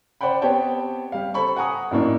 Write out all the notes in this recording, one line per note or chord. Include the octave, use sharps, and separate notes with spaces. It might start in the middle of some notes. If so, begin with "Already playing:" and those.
C5 D5 F#5 G5 B5
B3 C4 G4 C#5 G5 A5
G3 F5
A4 C5 B5 C#6
F#5 G#5 A#5 C#6 D#6
F#2 A2 A#3 D4 D#4